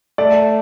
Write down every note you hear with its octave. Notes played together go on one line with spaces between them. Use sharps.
A3 D5